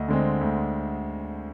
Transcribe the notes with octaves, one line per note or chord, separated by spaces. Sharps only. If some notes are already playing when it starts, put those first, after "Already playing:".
Already playing: D2 D#5
D3 G#3 C4
D2